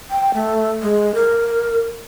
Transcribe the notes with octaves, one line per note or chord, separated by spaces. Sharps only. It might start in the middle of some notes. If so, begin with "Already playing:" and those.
G5
A3
G#3
A#4